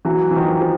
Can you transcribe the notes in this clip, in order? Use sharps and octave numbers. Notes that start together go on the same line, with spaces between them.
E3 F#3
E3
D#3 F3
F3